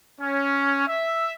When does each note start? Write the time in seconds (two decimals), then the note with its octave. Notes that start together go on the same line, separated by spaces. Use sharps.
0.19 C#4
0.87 E5